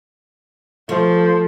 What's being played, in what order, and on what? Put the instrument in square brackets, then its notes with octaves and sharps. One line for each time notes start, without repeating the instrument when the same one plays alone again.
[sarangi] F3 [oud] A3